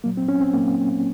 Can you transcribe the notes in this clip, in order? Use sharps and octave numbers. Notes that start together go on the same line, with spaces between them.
A#2 F#3 A#3
C4
C#4
C4
A#2 F#3 A#3